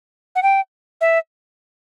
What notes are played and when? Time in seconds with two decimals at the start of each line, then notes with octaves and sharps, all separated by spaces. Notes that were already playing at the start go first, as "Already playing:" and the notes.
0.35 F#5
0.43 G5
1.01 E5